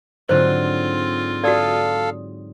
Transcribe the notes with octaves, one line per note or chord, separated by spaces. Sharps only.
G#2 D3 F#3 C4 F4 C5
F#4 A4 D5 F5 D#6